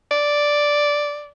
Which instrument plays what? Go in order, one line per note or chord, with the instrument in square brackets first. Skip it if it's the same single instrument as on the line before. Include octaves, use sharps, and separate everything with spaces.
[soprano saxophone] D5